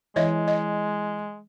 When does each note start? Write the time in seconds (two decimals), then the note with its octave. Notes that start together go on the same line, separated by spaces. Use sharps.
0.16 E3 G#3 C#5 D#5 E5
0.48 D#5